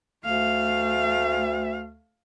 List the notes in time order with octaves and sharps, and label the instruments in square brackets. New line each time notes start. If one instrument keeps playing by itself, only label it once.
[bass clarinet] D2 [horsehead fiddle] A3 F5